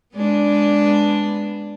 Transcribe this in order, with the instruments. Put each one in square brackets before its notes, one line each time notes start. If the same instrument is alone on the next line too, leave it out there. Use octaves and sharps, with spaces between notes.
[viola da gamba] G#3 B3 D4